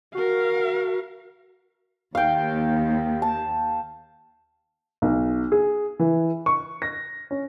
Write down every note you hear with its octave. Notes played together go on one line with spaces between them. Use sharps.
F#4 A#4 F5
D#2 F5 G5
A5
B1
G#4
E3
C#6
A#6
C#4